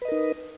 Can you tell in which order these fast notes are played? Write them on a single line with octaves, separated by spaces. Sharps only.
B4 D#5 A#4 D#4